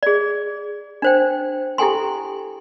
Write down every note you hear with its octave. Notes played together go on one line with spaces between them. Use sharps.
G#4 D5
D4 C5 G5
E4 G4 A4 G5 G#5 C6